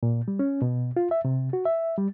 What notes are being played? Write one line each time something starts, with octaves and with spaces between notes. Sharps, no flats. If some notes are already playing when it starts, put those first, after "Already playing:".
A#2
G3
C#4
B2
F4
E5
C3
F#4
E5
G3